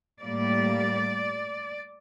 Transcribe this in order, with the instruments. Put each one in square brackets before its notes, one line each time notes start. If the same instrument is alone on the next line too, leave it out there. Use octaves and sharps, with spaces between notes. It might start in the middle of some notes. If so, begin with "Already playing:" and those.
[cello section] A2 G3 A#3 D5